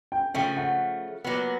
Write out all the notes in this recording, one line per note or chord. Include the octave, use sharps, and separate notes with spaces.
G5
C#3 F3 A3 G5
F#5
A#2 F#3 B3